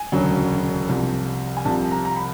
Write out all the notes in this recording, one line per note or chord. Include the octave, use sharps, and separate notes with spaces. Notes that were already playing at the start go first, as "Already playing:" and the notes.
Already playing: G#5
E1 D2 C#3 F#3
C2 C3 F3
G#5
C2 C3 F3 A5
A#5
A#5
B5